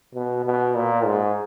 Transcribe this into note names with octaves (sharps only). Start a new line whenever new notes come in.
B2
B2
A#2
G#2